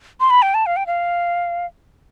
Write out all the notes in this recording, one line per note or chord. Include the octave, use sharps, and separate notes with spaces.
C6
B5
G5
A5
F5
G5
F5